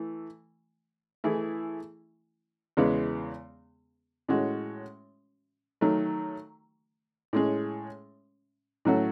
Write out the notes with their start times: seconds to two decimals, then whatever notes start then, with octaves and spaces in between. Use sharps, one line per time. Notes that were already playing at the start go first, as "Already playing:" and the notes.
Already playing: E3 A3
1.24 E3 A3 E4 G#4
2.77 E2 C#3 G#3 B3
4.29 A2 G#3 C#4 F#4
5.81 D#3 F#3 A3
7.33 A2 G#3 C#4 G#4
8.85 A2 F#3 A3 C#4 F#4